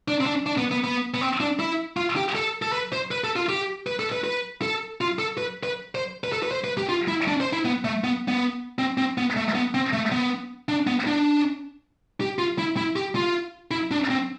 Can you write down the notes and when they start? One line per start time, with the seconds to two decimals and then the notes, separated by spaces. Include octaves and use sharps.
0.08 D4
0.21 C4
0.26 D4
0.46 D4
0.58 B3
0.71 B3
0.84 B3
1.14 B3
1.21 C4
1.40 D4
1.59 E4
1.97 F4
2.16 G4
2.35 A4
2.62 A4
2.73 B4
2.93 C5
3.11 B4
3.24 A4
3.36 F4
3.49 G4
3.87 B4
4.00 A4
4.12 B4
4.24 B4
4.62 A4
5.01 F4
5.19 A4
5.38 B4
5.63 B4
5.95 C5
6.24 B4
6.32 A4
6.43 B4
6.51 C5
6.64 B4
6.78 G4
6.89 F4
7.08 E4
7.28 D4
7.40 C5
7.53 E4
7.65 B3
7.85 A3
8.04 B3
8.28 B3
8.79 C4
8.98 C4
9.18 B3
9.37 A3
9.55 B3
9.74 C4
9.93 A3
10.12 B3
10.69 D4
10.87 B3
11.07 D4
12.21 G4
12.38 F4
12.58 E4
12.77 E4
12.96 G4
13.15 F4
13.71 E4
13.91 D4
14.10 C4